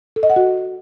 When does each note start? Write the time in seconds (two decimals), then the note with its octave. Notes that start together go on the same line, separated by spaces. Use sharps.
0.16 A4
0.23 D#5
0.30 F#5
0.36 F#4